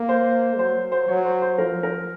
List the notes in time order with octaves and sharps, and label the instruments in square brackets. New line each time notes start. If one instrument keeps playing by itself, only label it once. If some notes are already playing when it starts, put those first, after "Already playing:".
Already playing: [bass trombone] A#3
[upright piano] C5
[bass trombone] F#3 [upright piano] C5
[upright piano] C5
[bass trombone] F#3 [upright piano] C#5
[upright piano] C5
C5
[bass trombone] F3 [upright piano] A#4
[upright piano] A#4